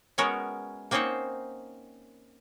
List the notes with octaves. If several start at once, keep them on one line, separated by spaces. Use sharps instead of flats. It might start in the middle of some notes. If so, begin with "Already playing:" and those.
G#3 B3 C#4 F#4 A#4 C#5
A#3 C4 C#4 D#4 C5 F#5